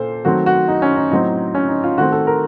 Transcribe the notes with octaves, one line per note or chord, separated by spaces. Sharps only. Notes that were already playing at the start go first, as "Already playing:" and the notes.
Already playing: A#2 A4 C5
D#3 F#3 A3 C4 F#4
F#4
D#4
C#4
D#4
A2 F#3 C4 D#4
C#4
D#4
F4
D#3 A3 C4 F#4
A4
A#4